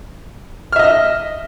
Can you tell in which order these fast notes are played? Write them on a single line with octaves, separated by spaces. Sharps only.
F6 E5 D#5